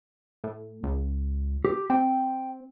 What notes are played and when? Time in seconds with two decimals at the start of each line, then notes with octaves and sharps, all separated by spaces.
0.44 A2
0.83 C#2
1.65 G4
1.90 C4 G5